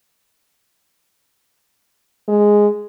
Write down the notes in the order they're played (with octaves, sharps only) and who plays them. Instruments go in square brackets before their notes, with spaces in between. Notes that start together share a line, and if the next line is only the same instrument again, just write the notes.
[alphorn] G#3